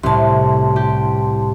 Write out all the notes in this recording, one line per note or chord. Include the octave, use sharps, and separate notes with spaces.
C2 A2 A5 C6
G4